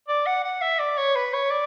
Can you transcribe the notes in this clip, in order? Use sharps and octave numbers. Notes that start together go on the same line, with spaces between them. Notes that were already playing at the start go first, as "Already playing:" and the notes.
D5
F#5
F#5
E5
D5
C#5
B4
C#5
D5